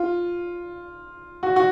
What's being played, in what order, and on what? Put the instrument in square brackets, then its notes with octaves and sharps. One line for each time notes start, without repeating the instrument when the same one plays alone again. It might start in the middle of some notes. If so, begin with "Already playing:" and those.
Already playing: [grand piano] F4
F#4
F#4